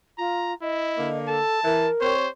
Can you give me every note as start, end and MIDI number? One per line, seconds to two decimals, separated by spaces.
0.18 0.54 65
0.18 0.53 82
0.62 1.09 64
0.62 1.19 75
0.99 1.39 50
0.99 1.39 58
1.28 1.60 69
1.28 1.89 81
1.65 1.88 52
1.65 2.14 70
2.01 2.26 60
2.01 2.26 67
2.01 2.29 72
2.01 2.26 73